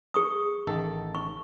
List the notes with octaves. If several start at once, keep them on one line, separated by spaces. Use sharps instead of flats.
G#4 C#6 D#6
A1 D#3 A4
C#6